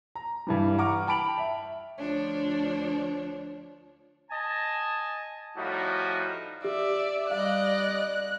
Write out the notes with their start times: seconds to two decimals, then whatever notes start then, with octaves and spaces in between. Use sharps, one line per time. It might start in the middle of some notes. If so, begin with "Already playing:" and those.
0.15 A#5
0.47 G2 E3 G3
0.78 F#5 A#5 C#6 D6 F6
1.07 G5 A5 B5 D7 F7 F#7
1.38 E5
1.98 D2 F3 D4 C#5
4.31 D#5 G#5 A5
5.57 A2 F3 G3 D#4 F#4
6.64 G4 D5 E5
7.31 G3 D5 D#5 F5 F#6